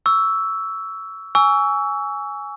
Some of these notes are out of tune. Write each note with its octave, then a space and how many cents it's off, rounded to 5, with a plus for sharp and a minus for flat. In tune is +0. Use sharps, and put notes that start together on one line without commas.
C#6 +30 E6 +0
G#5 +0 C#6 +30 E6 +0